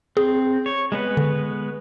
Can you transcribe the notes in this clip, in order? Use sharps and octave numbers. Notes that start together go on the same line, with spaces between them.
C4 G#4
C#5
G#3 B3 B4
D3